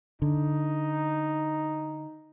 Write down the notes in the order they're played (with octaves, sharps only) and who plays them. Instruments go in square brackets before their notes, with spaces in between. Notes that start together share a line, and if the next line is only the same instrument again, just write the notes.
[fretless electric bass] D3 [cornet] D#4